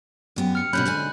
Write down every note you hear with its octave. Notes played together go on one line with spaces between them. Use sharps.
F#2 B3 G4
F6 C#7
B2 D3 C#4 B5 F#6 G6
G#2 D3 G#5